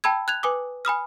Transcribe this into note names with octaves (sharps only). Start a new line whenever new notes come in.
G5 A5 B5 E6 G#6
F#6 G#6 F7
B4 G#5 D6 D#6
G#5 B5 D#6 F6